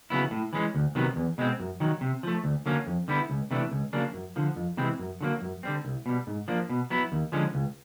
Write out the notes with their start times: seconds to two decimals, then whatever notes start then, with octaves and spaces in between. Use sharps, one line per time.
0.10 C#3 F#3 B3 E4
0.31 A2
0.53 E3 G#3 C#4
0.75 D2
0.95 C3 D#3 F#3 B3
1.16 E2
1.38 B2 G#3 C4
1.60 F#2
1.80 D#3 F#3
2.01 C3
2.23 F3 A3
2.44 D2
2.66 D3 F#3 A#3 C#4
2.87 F2
3.08 D3 G3 B3 E4
3.30 C#2
3.51 C3 E3 A3 D4
3.72 C#2
3.93 C#3 F#3 A#3 D4
4.14 F#2
4.36 D3 F3
4.56 F2
4.77 C3 E3 G#3 C4
4.99 F#2
5.21 D3 F#3 A#3
5.42 F#2
5.63 D3 G3 C4
5.85 C2
6.06 B2 G3
6.27 G#2
6.48 F3 A#3 D4
6.69 B2
6.90 F#3 B3 E4
7.12 D#2
7.32 D3 F3 G#3 C#4
7.54 C#2